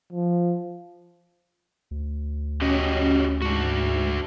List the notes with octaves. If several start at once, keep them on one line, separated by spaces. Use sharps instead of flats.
F3
D2
C#4 F#4 G4 D#5
G#2 D4 F#4